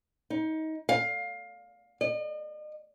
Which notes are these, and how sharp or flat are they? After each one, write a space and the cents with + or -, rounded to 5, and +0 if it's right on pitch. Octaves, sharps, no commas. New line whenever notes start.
D#4 +25
F5 +20
D#5 -40